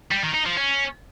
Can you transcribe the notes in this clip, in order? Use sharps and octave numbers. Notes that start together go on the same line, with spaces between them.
G3
D#3
D#4
F3
C#4